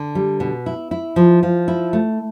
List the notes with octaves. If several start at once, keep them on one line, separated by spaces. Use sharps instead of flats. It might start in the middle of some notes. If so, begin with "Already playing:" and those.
Already playing: D3
G3
B2
E4
E4
F3
F3
E4
A3